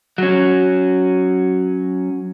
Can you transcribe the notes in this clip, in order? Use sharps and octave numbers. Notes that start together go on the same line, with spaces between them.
F#3 C#4